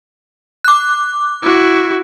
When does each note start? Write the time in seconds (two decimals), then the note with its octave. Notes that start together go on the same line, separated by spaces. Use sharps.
0.64 D6 F#6
1.42 E4 F#4